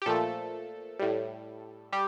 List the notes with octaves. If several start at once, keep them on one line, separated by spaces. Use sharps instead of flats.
G4
A#2 F3 A3 A4
A2 G3
G3 G4